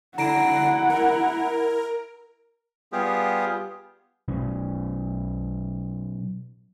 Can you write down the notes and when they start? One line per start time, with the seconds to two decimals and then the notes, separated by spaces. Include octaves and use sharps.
0.18 D3 E4 F#5 A#5 A#6 C7 D7
0.90 A#4
2.92 G3 B3 F4 G4 G#4
4.28 B2 F#3 C#4